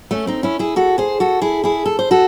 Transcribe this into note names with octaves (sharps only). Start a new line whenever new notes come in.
A3 C#4
C4 D#4
C#4 E4
E4 G#4
F#4 A4
G#4 C5
F#4 A4
E4 G#4
E4 G#4
A4
C5
F#4 A4